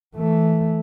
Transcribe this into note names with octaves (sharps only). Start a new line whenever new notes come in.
E3 A3